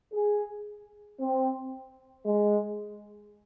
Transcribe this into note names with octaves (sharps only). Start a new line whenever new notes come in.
G#4
C4
G#3